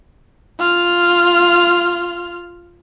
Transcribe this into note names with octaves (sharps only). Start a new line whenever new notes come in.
F4 F6